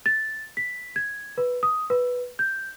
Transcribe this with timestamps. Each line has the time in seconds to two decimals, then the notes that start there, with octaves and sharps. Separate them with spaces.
0.06 A6
0.57 B6
0.96 G#6
1.38 B4
1.63 D#6
1.90 B4
2.39 G6